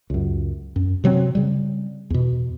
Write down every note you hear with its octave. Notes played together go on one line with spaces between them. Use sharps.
C#2 F#2
F#2
C3 F#3 G3 C4
C#3 G3
E2 B2